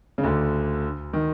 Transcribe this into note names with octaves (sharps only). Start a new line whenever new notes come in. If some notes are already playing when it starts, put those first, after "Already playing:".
C#3
D2 D3
D#3